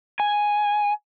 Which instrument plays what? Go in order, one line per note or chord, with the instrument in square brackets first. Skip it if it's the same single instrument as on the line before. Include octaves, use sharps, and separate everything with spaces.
[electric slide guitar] G#5